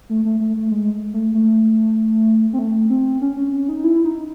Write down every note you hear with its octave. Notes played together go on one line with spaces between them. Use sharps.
A3
A3
A3
A3
G#3
A3
A3
C4
A3
C4
C#4
C#4
C#4
D#4
E4
D#4